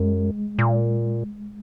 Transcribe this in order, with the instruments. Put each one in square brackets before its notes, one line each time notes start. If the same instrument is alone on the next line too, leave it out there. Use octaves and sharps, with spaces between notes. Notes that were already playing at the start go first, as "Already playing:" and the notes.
Already playing: [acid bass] F#2 [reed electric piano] G#3
[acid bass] A#2